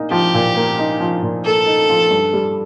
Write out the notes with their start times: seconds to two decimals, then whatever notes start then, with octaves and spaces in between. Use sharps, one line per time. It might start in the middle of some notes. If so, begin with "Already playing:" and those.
Already playing: A#2 A#3 D#4
0.11 F3 G4
0.34 A#2
0.56 A#3
0.79 D#4
1.00 F3
1.22 A#2
1.44 A#3 A4
1.66 D#4
1.89 F3
2.11 G2
2.33 G3